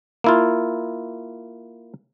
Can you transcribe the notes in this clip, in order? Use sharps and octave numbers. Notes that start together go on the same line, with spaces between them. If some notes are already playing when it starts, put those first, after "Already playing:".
A#3 E4 F4